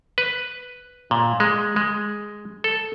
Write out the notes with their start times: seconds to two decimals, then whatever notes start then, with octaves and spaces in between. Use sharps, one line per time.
0.18 B4
1.11 A#2
1.40 G#3
1.76 G#3
2.64 A4